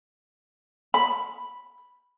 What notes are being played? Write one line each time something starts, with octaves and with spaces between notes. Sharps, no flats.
B5